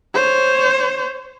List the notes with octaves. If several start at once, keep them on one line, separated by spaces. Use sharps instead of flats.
C5 C#5